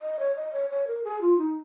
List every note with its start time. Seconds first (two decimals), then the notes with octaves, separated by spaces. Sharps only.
0.02 D#5
0.19 C#5
0.36 D#5
0.53 C#5
0.70 C#5
0.87 A#4
1.04 G#4
1.21 F4
1.38 D#4